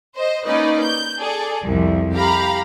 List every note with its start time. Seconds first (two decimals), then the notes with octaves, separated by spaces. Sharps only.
0.15 C5 D#5
0.45 A#3 C#4 D#4 B4 D5 D#5
0.82 G6
1.19 G#4 A4 D5
1.63 C2 F2
2.12 G4 F5 A#5 B5